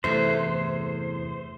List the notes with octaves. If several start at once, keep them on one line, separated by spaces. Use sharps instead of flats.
E2 G2 C3 E3 A3 C5